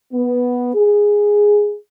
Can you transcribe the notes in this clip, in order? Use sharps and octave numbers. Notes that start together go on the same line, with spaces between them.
B3
G#4